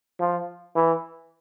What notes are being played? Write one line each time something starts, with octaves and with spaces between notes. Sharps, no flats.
F3
E3